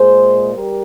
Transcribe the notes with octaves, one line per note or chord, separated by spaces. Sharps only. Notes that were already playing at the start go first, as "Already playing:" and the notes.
Already playing: A#2 G#3 G#4 C5
G3 G4 A#4